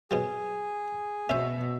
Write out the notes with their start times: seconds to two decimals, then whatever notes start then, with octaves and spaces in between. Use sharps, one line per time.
0.11 G#2 B2 F#3 G#4
1.29 B2 C#4 C5 E5